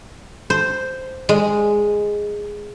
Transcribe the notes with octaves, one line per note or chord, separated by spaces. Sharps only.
C5
G#3